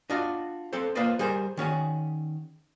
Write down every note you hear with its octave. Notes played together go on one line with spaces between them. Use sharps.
D4 F4 F#4 D#5
C4 A4 C5
A#3 F4 B4 C5 D5 D#5
G3 G#4 A#4 C5
D#3 C#4 F#4 G#4